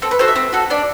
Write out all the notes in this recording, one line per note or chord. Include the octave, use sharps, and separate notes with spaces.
C4 A4
B4
F#4 A4 C5
E5
C4
F#4 A4
D4 D5